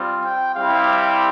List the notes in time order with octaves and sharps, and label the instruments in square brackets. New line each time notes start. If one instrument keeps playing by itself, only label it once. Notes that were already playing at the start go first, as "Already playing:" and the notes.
Already playing: [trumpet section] G3 C4 F4
G5
G3 C4 E4 G4 F5